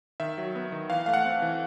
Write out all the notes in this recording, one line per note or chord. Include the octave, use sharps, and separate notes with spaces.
D#3 E5
F#3
B3
D#3
E3 F5
A3 F5
F#5
C4
E3